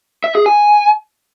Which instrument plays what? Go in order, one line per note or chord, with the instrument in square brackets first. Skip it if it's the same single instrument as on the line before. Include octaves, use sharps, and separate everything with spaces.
[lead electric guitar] E5
G#4
G#5